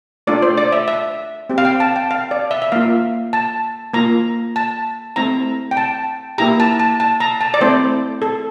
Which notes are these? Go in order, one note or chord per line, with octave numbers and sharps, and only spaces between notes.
A3 D4 F4 D5
C5
D5
E5
E5
C4 G4
F5
G5
A5
G5
F5
D5
E5
E5
A#3 F4 F5
A5
A#3 F4 A#5
A5
A3 C4 E4 A#5
G5
A5
A#3 E4 G4 A#5
A5
A5
A5
A#5
A5
D5
A3 C4 E4 C5
A4